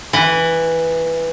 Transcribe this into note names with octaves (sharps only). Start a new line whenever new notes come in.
E3